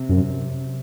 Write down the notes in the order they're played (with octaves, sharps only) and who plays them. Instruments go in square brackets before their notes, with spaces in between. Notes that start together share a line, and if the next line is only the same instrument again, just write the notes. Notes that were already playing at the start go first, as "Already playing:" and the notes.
Already playing: [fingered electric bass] C3
[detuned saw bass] F#2